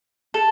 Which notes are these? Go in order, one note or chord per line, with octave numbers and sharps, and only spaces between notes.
A4